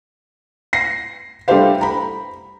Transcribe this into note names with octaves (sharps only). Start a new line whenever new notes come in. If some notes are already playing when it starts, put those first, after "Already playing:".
A#6 C7
G3 A3 D4 G4 C5 F5
A#5 B5